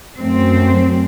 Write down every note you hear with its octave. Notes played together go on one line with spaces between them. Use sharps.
F#2 A3 C4